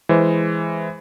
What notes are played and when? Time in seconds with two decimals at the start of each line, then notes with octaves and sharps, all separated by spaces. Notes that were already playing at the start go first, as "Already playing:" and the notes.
0.09 E3 G#3 C5